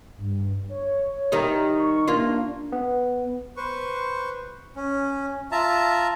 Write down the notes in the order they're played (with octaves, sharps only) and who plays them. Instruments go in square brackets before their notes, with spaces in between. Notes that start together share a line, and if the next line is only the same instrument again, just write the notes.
[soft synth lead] G2
C#5
[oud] D#3 G3 D#4
[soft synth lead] C#6
[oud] A#3 F4 [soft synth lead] D4
[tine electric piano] B3
[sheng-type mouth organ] B4 C5 C#6
C#4
F4 E5 A5 A#5